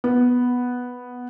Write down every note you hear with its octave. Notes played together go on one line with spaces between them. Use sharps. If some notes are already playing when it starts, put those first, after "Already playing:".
B3